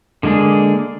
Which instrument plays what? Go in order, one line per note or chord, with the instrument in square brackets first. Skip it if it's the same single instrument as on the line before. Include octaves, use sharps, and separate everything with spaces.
[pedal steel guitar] D3 G#3 A#3 D4 G#4